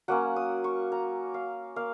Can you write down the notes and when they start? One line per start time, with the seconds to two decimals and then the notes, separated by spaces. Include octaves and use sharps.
0.08 F#3 A#3 C#4 F#5
0.36 D#6
0.64 C#6
0.92 A#5
1.34 F5
1.76 A#3 F5